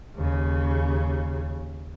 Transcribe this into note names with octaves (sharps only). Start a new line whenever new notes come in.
D#2 C#3